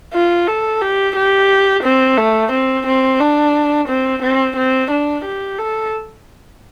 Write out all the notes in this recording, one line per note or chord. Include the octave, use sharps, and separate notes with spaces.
F4
A4
G4
G4
C4
A3
C4
C4
D4
C4
C4
C4
D4
G4
A4